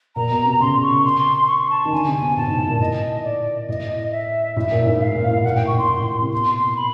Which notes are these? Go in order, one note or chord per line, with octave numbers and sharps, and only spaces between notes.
A#2 A#5
B2
C3
C#3 C6
C#6
C6
C#6
A5
D#3
D3 G#5
C3
G#5
B2
A2 A5
G#2
A2
A#2
A2 D#5
D5
A2 D#5
E5
A2 E5
A#2
G#2
A2 F5
A#2
A2
A#2 F#5
A2 G5
A#2 C#6
A2 C6
A2
A2
A#2
C3
B2 C6
C6
B5